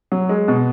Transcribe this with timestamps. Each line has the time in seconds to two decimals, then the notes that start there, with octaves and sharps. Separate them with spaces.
0.12 F#3
0.29 G#3
0.48 B2